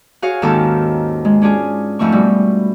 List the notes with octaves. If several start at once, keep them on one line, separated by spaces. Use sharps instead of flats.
F#4 G#4 C#5 F5
D#2 G#2 D#3 C#4 A4 A5
G#3
C#4 D4 F4 G#4
F2 G#2 F3 A3 C#6
B2 G3